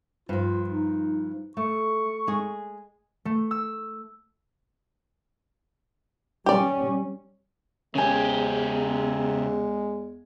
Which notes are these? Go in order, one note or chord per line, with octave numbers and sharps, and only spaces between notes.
G2 F3 F4
D#4
A3 C#6
G#3 G#4
A3
E6
G3 C#4 G4 D5
E2 C#3 G#3 C#4 G4 G#5